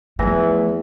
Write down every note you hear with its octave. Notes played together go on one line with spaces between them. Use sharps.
E2 E3 F3 A3 E5 G#5 A#6